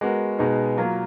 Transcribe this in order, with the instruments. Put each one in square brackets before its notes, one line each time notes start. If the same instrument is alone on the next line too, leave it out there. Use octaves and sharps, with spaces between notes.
[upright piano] G#3 B3 F#4 A#4
B2 G#3 B3 D#4 G#4
F#3 A#3 F4 A#4